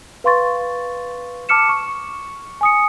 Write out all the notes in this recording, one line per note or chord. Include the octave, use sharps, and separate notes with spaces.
B4 F5 C6 C#6 A6
A5 D6 F6 C#7 E7
C#6
G#5 D#6 C#7